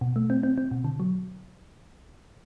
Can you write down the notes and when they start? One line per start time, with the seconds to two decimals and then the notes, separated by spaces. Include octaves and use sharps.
0.01 B2
0.16 A3
0.30 C4
0.43 C4
0.58 C4
0.71 B2
0.84 D3
1.00 F#3